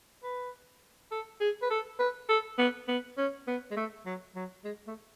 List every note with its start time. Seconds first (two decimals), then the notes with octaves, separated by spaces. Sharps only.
0.23 B4
1.11 A4
1.40 G#4
1.62 B4
1.70 A4
1.99 B4
2.29 A4
2.58 B3
2.88 B3
3.18 C#4
3.47 B3
3.71 G#3
3.76 A3
4.06 F#3
4.35 F#3
4.64 G#3
4.87 A3